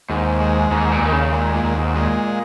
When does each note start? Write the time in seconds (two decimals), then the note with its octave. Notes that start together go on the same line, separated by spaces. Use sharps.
0.09 D#2 G#2
0.41 G#3
0.71 D#2 G#2
0.92 A#2
1.02 D#2 D#3
1.12 C#3
1.33 A#2 G#3
1.54 A#2
1.64 D#2
1.74 G#2
1.95 A#2 G#3